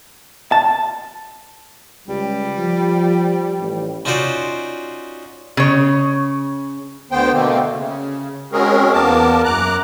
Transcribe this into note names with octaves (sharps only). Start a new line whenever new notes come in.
A5
C#2 G3
F3
A1
C#4 D#4 F4 F#4 C5 D5
C#3 C#5
D2 D3 B3 C5 G5
B2 D3 A3 A#3 C4
C#3
G#3 C4 C#4 F#4 G#4 A#4
E2 A#3 B3 A#4 A5 D6
F#2 A#5 D6 F#6